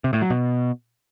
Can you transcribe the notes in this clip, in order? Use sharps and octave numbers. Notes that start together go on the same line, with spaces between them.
C3
A2
F#3
B2